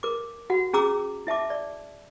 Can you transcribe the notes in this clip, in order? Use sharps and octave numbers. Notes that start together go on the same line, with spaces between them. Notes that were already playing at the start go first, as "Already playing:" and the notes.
A#4 D6
F#4 F#5
C#4 G#4 A#5 D6 E6
E4 E5 A5 D6
D5